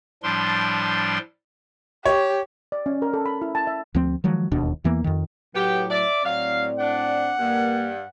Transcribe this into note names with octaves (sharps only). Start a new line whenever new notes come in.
A2 F3 G3 D4 C6
G4 C#5
D5
C#4
A#4
A4
B5
E4
A5
E5
D2 F3 C4
D#3 F3 F#3 G#3
E1 D#2 B2 D4
E2 E3 A#3 B3
F2 D#3
A2 F#3 B3 G4
D5 E5
A2 F#3 C4 D5 F5
D4 F#5
G2 A#3